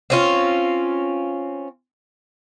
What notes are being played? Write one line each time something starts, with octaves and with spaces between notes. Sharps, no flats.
C4 C#4 F4